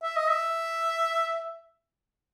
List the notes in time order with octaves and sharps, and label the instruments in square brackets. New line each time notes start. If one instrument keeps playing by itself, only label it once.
[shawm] E5
D#5
E5